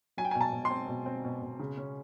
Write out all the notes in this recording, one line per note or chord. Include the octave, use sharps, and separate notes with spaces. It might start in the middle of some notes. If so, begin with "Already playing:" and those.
F#3 G#5
G5
G#5
B2
A5
B2
C6
C4
B2
C4
B2
B2
C#3
C#4